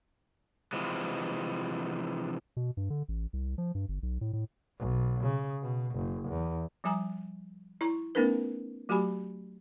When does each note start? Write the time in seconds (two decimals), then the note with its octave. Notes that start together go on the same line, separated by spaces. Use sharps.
0.73 C3 E3 F3 G#3
2.57 B2
2.77 G2
2.90 D3
3.08 A1
3.33 C2
3.58 F3
3.75 G2
3.89 G1
4.03 B1
4.21 A2
4.33 A2
4.79 B1
5.24 C#3
5.63 B2
5.95 F#1
6.29 E2
6.84 F3 G3 G#5 A#5
7.81 E4 A#5 C#6
8.15 A3 B3 C#4 D#4 A#4 B4
8.89 F#3 A3 F#4 G4 G#5 B5